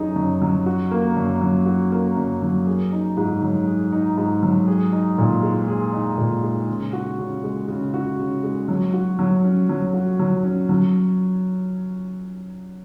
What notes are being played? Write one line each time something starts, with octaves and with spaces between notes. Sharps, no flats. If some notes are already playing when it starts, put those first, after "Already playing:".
Already playing: F#2 F#3 D#4 G#4
F#2
F#3
F#4
A#3
F#2
F#3
F#4
A#3
F#2
F#3
G#4
D#4
G#2
F#3
G#4
D#4
G#2
F#3
G#4
D#4
A#2
G#3
G#4
D#4
A#2
G#3
C#3
F#4
C#3
G#3
C#3
F#4
C#3
G#3
F#3
F#4
F#3
C#4
F#3
F#4
F#3
C#4
F#3